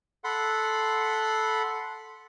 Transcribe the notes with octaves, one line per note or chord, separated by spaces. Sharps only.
A4 F#5 B5 C6